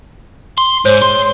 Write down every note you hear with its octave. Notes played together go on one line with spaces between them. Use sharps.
C6
G#2 C5 C#5 G6
C6